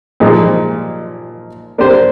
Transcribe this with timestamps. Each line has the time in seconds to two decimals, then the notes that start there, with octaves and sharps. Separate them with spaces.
0.20 A#2 F3 G#3 D#4
1.78 A#3 D4 G4 C5